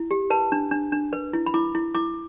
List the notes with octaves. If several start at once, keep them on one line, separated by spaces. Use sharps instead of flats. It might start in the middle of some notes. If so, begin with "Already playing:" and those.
Already playing: E4
G4
B4 A5
D4
D4
D4
B4
E4
B5
E4 D6
E4
E4 D6